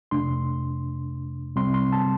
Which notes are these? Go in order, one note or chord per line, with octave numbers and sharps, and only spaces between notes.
F2 C3 A3 D4 C6
C3 G3 C4 C6
C6
A5